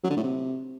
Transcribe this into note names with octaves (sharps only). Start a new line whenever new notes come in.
F#3
D3
A2
C3